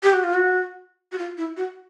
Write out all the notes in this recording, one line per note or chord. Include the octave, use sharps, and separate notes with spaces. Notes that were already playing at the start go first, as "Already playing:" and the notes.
G4
F#4
F4
F#4
F#4
F4
E4
F#4